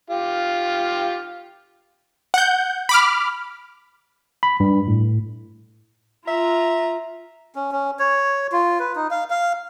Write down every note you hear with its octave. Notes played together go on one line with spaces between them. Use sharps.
F4 G4
F#5 G6
B5 D6 F6
B5
G2
A2
F4 E5 A#5
C#4
C#4
C#5
F4
B4
D#4
F5
F5